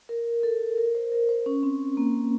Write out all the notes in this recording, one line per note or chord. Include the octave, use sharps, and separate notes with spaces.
A#4
A4
A#4
C5
A#4
C5
C#4
C4
A#3